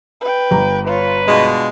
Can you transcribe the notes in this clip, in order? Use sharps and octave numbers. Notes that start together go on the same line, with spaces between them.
B4 G5
G1 A#5
F4 B4 C#5
B2 G#3 D4 F4